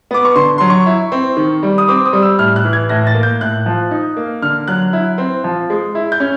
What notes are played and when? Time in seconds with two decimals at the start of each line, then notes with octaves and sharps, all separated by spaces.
0.11 B3 D6
0.25 C#6
0.36 D3 C6
0.58 F#3 C6
0.70 C#6
0.86 E4
1.12 C4
1.37 D#3
1.63 G3
1.78 D#6
1.88 C4 D6
2.06 D#6
2.13 G3
2.22 E6
2.38 A2 F6
2.56 F#6
2.65 E3
2.73 G#6
2.89 A2 A#6
3.07 A6
3.15 A#3
3.23 G6
3.41 A2 F#6
3.66 F3
3.91 D#4
4.17 A#3
4.42 D3 F6
4.68 F#3 F#6
4.93 E4
5.18 C4
5.44 F3
5.70 G#3
5.95 E4
6.12 G6
6.20 C#4